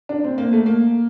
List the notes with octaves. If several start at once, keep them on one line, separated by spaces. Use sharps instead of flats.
D4
C4
A#3
A3
A#3